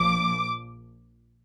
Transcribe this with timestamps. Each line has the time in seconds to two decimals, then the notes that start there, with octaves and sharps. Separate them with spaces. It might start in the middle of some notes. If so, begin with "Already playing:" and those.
Already playing: A#1 A#2 F3 D6